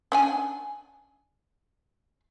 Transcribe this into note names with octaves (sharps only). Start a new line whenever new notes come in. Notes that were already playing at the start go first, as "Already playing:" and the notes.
C#4 D4 G#5